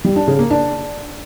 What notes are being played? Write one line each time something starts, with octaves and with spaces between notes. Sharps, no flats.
G3
D4
C#3
A#3
D4